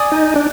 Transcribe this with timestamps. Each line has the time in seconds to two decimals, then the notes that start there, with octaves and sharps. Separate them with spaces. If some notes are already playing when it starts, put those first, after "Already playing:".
Already playing: D5 G#5 D#6
0.12 D#4
0.36 D4